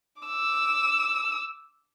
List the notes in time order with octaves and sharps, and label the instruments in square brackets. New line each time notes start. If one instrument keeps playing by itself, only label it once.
[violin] D6 E6